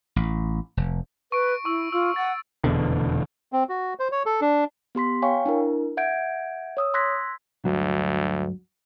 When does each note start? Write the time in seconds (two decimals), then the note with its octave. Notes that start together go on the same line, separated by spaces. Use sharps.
0.16 A1
0.77 F1
1.32 B4 C#6 D7
1.65 E4 C#6 E6
1.92 F4 E6
2.16 F#5 A6
2.64 F1 E2 B2 D3
3.53 C4
3.69 F#4
3.99 C5
4.12 C#5
4.26 A4
4.41 D4
4.95 B3 G4 C6 B6
5.22 C#5 F5 G5 G#5 C#6
5.46 D4 E4 A#4
5.97 E5 F#5 G6 G#6 D7
6.77 C#5 D#6 E6
6.94 C6 E6 F#6 G#6 A#6 B6
7.65 D2 G2 F#3